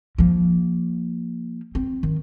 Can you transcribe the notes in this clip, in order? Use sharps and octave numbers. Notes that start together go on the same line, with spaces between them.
F3 A#3
C4
D#3